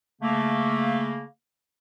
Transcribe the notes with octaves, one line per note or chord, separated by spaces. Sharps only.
C#3 A3 A#3